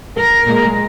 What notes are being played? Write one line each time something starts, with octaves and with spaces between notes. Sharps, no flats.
A#4
A#2 G#3